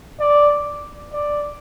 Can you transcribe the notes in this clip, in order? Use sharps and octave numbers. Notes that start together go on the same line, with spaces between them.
D5
D5